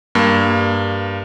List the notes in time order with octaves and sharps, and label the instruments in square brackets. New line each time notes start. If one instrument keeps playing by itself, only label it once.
[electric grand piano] G2 A#3